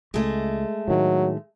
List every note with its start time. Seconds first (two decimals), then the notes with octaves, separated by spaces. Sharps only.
0.14 C#2 G#3 A3
0.88 A2 D#3 F#3